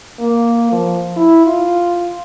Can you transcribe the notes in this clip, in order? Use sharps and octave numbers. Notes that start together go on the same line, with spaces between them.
A#3
F3
E4
F4